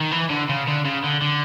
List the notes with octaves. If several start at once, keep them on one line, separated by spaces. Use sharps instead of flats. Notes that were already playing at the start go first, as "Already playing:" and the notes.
D#3
E3
D3
C#3
D3
C#3
D3
D3